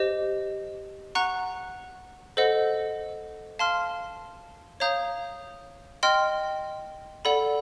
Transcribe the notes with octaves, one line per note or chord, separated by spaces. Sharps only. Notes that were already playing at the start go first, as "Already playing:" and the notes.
Already playing: G4 C5 D#5
F#5 A#5 C#6 F#6
A4 C5 D#5 F#5
F5 A5 C6 F6
C#5 F5 A#5 D#6 G6
D#5 G5 C6 F6
A4 D5 F#5 B5